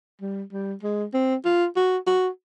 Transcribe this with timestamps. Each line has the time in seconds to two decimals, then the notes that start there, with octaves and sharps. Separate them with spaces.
0.21 G3
0.52 G3
0.83 G#3
1.14 C4
1.45 F4
1.76 F#4
2.07 F#4